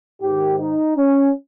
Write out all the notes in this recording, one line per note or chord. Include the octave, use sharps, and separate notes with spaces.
G#2 D#3 G4
D#4
C#4